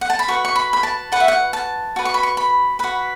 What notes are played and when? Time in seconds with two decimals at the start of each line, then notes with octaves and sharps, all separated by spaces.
0.01 F#5
0.10 A5
0.19 B5
0.28 F#4 B4 C#6
0.45 C#6
0.55 B5
0.73 B5
0.83 A5
1.12 F#4 B4 F#5
1.20 E5
1.28 F#5
1.53 A5
1.96 F#4 B4
2.05 C#6
2.14 B5
2.23 C#6
2.37 B5
2.79 F#4 B4 B5